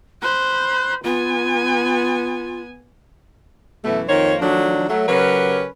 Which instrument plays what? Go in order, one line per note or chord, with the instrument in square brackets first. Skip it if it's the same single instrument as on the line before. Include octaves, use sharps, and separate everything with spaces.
[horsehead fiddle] C5 B5 [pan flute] F#6
[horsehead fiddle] B3 G#5 [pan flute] F4
[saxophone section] F#2 B2 E3 A3
F2 D#3 A#3 C5 C#5
D#3 F3 F#3 A3 D4
F#3 A3
C#3 F#3 C#4 G4 A#4 B4